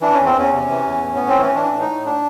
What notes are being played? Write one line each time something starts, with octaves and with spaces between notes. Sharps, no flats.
E3 D4
C#4
E2
C4
E2 C#4
C3
E3
E2
A2
B3
A2
C4
E3 C#4
E3 D4
A2
D#4
A2
D4